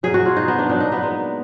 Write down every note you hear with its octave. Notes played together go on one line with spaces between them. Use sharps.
B2 F#3 G#4
F#4
F4
D#4
B3
D4
A#2 F#3 D4
D#4
B3
G#3